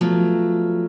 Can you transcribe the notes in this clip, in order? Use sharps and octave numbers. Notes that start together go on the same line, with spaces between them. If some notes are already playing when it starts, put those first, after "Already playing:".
F3 F#3 A3 B3